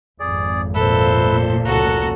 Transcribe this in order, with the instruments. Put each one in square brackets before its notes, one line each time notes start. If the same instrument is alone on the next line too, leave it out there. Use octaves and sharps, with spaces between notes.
[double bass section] G#1 F2 [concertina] G#4 D5
[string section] A#2 [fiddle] A4 C5 [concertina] B4 E5
[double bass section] F1 C#2 C#3 [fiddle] F#4 A4 [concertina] A#5 F#6